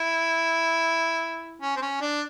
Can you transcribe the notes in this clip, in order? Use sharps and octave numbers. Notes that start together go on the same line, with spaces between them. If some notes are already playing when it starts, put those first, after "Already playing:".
Already playing: E4
C#4
C4
C#4
D4